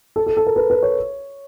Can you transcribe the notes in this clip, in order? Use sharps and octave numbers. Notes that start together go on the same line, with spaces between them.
A4
A4
A4
A#4
B4
B4
C#5